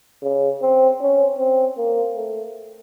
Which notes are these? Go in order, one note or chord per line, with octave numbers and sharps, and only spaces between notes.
C#3
C4
C#4
C4
A#3
A3